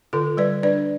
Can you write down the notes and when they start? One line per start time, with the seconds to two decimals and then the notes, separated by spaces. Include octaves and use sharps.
0.13 D3 F4 A4
0.37 G3 B4 D5
0.63 D4 B4 D5